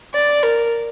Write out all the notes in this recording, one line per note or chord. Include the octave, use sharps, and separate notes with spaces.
D5
A#4